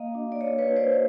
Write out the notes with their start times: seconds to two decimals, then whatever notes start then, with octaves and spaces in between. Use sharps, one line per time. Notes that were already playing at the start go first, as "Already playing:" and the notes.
Already playing: A#3 D#5 F5
0.14 D4 F#4
0.32 D5
0.41 A#3 C#5 D#5
0.58 B4 C#5
0.68 D4 F#4
0.76 C5 D5